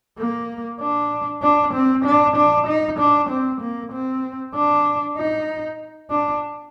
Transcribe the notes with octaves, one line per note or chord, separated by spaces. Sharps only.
A#3
D4
D4
C4
D4
D4
D#4
D4
C4
A#3
C4
D4
D#4
D4